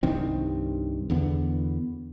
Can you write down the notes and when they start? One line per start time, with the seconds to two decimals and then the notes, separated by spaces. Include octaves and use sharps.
0.03 C2 G2 D#3 C4
1.10 E2 D3 B3